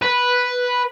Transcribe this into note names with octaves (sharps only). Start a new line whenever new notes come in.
B4